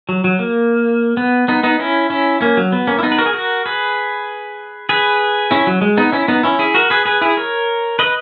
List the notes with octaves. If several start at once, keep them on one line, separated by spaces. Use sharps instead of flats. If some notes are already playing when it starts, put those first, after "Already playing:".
F#3
F#3
A#3
B3
B3 D#4
B3 D#4
C#4 E4
C#4 E4
A#3 C#4
F#3
B3
A#3 C#4
E4
B3 D#4
B4
F#4 A#4
G#4
F#4 A#4
G#4 B4
G#4 B4
C#4 E4
F#3
G#3
B3 D#4
C#4 E4
B3 D#4
C#4 E4
E4 G#4
F#4 A#4
G#4 B4
G#4 B4
E4 G#4
A#4 C#5
B4 D#5